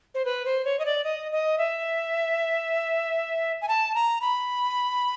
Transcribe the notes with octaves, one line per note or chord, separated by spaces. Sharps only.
C5
B4
C5
C#5
D#5
D5
D#5
D#5
E5
G#5
A5
A#5
B5